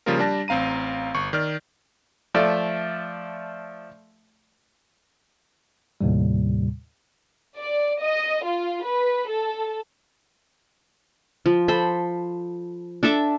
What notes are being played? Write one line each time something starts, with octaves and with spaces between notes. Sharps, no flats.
C#3 F3 G3 A#3 F4 A#4
G3 D4 A5 A#6
A1 C4 F5 A#5 D#7
G1 C#6
D#3 D5 F6
F3 A3 D5 E5
D#2 A2 C3 G3
D5
D#5
F4
B4
A4
F3
A4 C5 B5
D4 A4 E5 D6